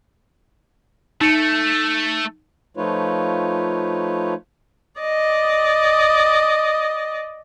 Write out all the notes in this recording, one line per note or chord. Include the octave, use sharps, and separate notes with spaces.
A3 D#4 C#7
F3 A3 D#4 F4 B4 C#5
D5 D#5